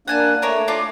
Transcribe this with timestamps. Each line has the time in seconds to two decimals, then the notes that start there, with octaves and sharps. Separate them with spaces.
0.08 A#3 D4 F#5 G#5 A5
0.42 A3 D4 A#4 C#5
0.68 F4 D5 A5